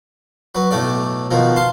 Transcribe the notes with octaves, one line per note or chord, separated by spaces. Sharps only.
F#3 B4
B1 A2 A3 D5
B2 D#3 F3
F5 A5 C6